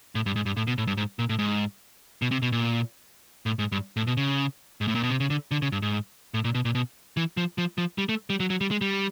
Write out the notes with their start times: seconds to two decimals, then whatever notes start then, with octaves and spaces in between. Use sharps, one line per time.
0.15 A2
0.26 G2
0.36 G#2
0.46 G2
0.57 A2
0.67 B2
0.78 A2
0.87 G2
0.97 G#2
1.19 A#2
1.29 A2
1.39 G#2
2.22 B2
2.31 C3
2.42 B2
2.52 A#2
3.46 A2
3.59 G#2
3.72 G2
3.97 A2
4.07 B2
4.17 C#3
4.81 G#2
4.88 A2
4.95 A#2
5.03 B2
5.10 C3
5.20 C#3
5.30 D3
5.51 D3
5.62 C#3
5.72 G2
5.82 G#2
6.34 A2
6.44 A#2
6.55 B2
6.65 A#2
6.75 B2
7.17 E3
7.37 F3
7.58 F3
7.78 F3
7.98 G3
8.09 A3
8.30 G3
8.40 F#3
8.50 F#3
8.61 G3
8.71 G#3
8.81 G3